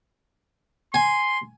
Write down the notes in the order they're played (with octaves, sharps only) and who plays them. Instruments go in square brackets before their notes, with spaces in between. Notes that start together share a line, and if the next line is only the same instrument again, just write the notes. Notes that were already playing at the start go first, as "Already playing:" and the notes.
[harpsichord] G#5 [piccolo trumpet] C6